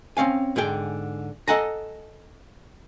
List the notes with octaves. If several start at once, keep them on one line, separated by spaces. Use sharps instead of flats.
C4 C#4 F5 G#5
G#2 D3 G#4 G5
A4 D#5 F#5 G#5 A#5